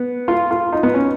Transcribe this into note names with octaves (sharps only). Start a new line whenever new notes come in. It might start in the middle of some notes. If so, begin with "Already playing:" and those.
Already playing: B3
F4
F4
D#4
B3
C#4